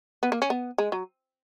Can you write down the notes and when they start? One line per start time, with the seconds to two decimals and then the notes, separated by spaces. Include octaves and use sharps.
0.23 B3
0.32 A#3
0.42 C#4
0.50 B3
0.78 G#3
0.92 F#3